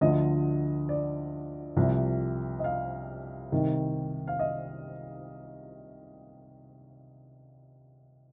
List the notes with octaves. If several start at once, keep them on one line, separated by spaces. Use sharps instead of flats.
D2 D3 F3 D#5
D5
C2 C3 F3
D#5
F5
C2 C3 D#3
F5
D#5